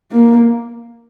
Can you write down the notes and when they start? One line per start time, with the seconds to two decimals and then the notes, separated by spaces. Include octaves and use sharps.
0.12 A#3